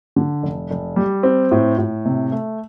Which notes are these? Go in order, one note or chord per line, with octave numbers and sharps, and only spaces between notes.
D3
F1
F1
G3
C4
A2
A2
C3
A3